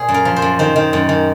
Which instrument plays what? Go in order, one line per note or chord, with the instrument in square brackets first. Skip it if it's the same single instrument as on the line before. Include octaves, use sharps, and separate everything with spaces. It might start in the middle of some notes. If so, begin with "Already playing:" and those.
Already playing: [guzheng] A#2 G#4 C5
F#2
A#4
F3
C5
F#2
D#3 C5
D#3
F#2
D#3